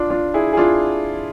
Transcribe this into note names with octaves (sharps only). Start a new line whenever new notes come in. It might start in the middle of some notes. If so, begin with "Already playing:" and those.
Already playing: D4 F4
D4 F4
E4 G#4
G#4
D4 F4